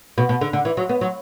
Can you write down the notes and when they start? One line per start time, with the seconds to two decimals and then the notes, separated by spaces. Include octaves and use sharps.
0.18 B2
0.29 B2
0.41 D3
0.53 D3
0.65 E3
0.77 F#3
0.89 B3
1.01 F#3